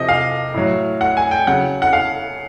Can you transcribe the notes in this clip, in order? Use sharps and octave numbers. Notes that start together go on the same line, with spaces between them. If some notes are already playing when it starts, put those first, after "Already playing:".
Already playing: C3 F3 D#5
F5
A2 F#3
F#5
G#5
G5
C#3 F#3 F#5
F#5
F5